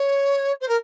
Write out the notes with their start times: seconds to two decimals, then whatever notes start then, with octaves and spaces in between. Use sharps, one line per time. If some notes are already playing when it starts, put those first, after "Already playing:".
Already playing: C#5
0.60 C5
0.68 A#4